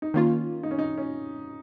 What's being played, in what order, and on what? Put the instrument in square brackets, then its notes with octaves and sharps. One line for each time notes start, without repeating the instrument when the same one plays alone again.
[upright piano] D#4
[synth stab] D#3 A#3 F4 [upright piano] C#4
[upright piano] D#4
C#4
D#4
C#4